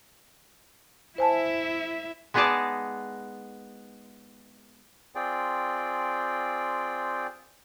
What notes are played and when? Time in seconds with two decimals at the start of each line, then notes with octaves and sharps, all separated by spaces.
1.18 E4 C5 E5 G#5 A5
2.34 G#3 B3 D#4 G#4 D5 A5
5.15 C4 F4 G#4 D5 G5